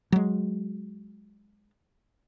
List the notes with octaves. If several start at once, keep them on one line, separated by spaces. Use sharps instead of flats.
F#3 G#3